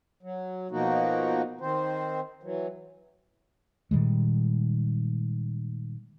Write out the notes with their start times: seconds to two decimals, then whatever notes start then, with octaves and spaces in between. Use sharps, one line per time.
0.23 F#3
0.71 B2 F3 A#3 D#4 F#4
1.61 D#3 C4 C5
2.43 E3 F#3
3.91 A#2 D#3 G3 G#3